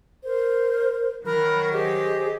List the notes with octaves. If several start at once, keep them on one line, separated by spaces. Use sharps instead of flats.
A#4 C5
D#3 F#3 A#4 B5 F#6
G4 G#4 C5 D#5